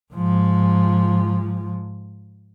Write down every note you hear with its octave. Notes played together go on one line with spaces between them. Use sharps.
G#2 F3